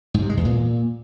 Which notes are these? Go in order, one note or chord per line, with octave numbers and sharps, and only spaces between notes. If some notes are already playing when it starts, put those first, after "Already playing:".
G#2
C3
G#3
E2
A#2